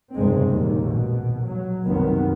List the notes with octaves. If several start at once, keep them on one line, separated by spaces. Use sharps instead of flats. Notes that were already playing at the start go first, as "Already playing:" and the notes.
F1 C#2 G2 G#3 C4
A#1 D#2
B2
F#3
C2 F#2 D#3 B3